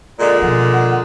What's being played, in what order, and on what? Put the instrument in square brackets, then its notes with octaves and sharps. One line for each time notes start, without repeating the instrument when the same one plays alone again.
[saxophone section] A#2 D3 G#3 [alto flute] D5
[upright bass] B2 F3 [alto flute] F#5